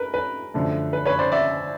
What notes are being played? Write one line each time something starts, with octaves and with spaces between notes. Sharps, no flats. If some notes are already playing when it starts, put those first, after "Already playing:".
Already playing: A#4 B4
B4
F#2 D3 F3 A3
B4
B4 C#5
C5 D5
D5 E5